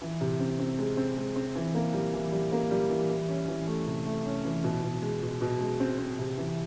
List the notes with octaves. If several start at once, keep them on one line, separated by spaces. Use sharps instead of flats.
E3
C3
C4
C4
G#3
C4
G#3
C4
E3
A#3
G3
E3
G3
A#3
G3
E3
E3
C#4
E3
A3
C3
A3
C#4
E3
B2
B2
G#3
B2
B2
G#3
C4
C4
C3
E3